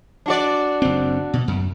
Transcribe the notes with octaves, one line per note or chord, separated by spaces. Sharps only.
D4 F#4 D5
F#1 C4
B2
F#2